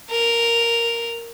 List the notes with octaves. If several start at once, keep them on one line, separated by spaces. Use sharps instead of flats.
A#4